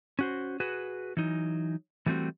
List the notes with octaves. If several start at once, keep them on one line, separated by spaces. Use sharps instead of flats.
C#4 F#4 C5
F#4 G#4 B4
E3 F#3 D#4
E3 G3 A3 C4 F#4